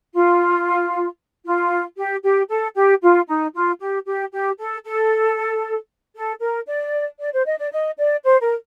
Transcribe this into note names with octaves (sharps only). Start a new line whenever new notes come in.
F4
F4
G4
G4
A4
G4
F4
D#4
F4
G4
G4
G4
A4
A4
A4
A#4
D5
D5
C5
D#5
D5
D#5
D5
C5
A#4